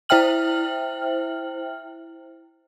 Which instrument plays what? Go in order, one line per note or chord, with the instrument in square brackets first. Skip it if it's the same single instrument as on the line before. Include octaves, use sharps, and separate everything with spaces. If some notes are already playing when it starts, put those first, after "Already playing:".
[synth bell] E4 C5 E5 G5 F6 F#7